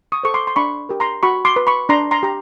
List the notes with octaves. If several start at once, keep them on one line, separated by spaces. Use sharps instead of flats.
C#6 D#6
A4 C5 C#6
C6 D6
C6
D4 B5 C#6
G4 A#4
A#5 C6
F#4 B5 C#6
C6 D6
B4
B5 C#6
D4 A#5 C6
A#5 C6
G4 A#5